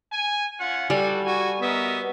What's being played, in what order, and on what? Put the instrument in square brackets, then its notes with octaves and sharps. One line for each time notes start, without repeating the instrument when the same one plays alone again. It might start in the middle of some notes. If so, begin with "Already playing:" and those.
[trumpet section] G#5
C#4 F4 F#5
[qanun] G3 [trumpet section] F#4 A4 [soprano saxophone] G#5
[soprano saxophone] F#4 [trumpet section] G#5
[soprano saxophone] B3 [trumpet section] A#4 D#5 E5